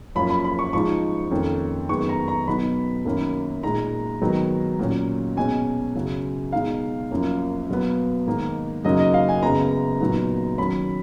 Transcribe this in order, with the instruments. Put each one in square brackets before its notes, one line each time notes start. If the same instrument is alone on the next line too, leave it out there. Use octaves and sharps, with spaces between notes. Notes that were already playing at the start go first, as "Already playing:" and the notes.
[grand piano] F#2 F3 A#3 C#4 B5
B5
B5
C#6
G#2 F3 G#3 D#4 C#6
F2 D#3 A#3 C#4
F#2 D#3 G#3 B3 D#4 C#6
A#5
A#5
B2 F#3 B3 D#4 B5
F#2 D#3 A#3 C#4
A#2 G#3 D#4 A#5
G#2 D#3 F#3 B3 D#4
A#2 F#3 C#4
B2 G#3 C#4 G#5
F#2 C#3 F#3
B2 G#3 D#4 F5
F#2 F3 A#3 C#4
B2 F#3 B3
G#2 D#3 A#3 D#4
F#2 C#3 F#3 A#3 D#4 D#5
D#5
F5
G#5
F#2 C#3 G#3 B3 A#5
A#2 F#3 B3 D#4
D#3 F#3 C#4 B5